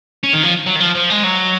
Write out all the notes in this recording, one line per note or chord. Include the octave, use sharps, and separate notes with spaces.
C#4
D#3
F3
F#3
D#3
F3
F3
G#3
F#3